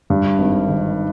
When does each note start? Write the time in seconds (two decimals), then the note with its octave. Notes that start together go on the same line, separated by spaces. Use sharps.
0.10 G2
0.38 G#1
0.67 D#3